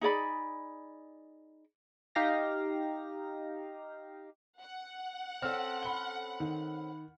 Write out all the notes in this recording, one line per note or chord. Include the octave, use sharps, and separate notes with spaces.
D#4 G#4 D5 B5
D#4 G4 F5 A#5 A#6
F#5
C4 C#4 A4 F6
B5 G7
D#3